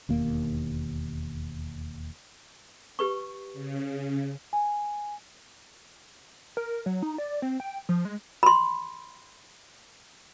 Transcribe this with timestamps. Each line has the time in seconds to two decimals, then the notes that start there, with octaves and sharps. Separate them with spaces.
0.09 E1 D#2 A#3
2.99 G4 B4 C#6
3.54 C#3
4.53 G#5
6.57 A#4
6.86 F#3
7.03 D#4
7.18 D5
7.42 C4
7.60 G5
7.89 F3
8.05 G#3
8.43 B5 C6